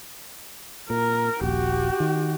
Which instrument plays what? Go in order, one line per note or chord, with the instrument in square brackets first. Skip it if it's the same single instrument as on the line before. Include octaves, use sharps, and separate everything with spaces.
[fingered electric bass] A#2 [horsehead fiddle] A#4
[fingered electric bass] D#1 A#1 [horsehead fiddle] F#4 G4
[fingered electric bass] D#3